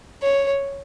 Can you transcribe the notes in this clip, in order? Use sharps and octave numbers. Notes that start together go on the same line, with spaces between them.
C#5